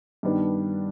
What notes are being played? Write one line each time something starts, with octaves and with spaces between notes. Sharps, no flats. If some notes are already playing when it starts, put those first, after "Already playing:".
G2 D#3 G3 B3 D4